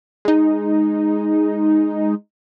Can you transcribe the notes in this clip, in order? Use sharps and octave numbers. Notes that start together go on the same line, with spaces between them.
G#3 D#4